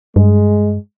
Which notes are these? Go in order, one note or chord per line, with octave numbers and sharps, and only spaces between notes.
G2 G#3